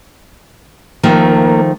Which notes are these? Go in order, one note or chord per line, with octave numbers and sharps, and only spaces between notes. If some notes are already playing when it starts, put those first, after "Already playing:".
D#3 F3 A3 A#3